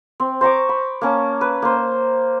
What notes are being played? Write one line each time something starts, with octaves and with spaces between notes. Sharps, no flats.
C4
C5 A#5 C#6 D6
B5
A#3 C#4 A5
B4
A#3 C5